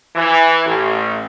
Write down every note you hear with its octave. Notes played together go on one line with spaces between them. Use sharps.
E3
A1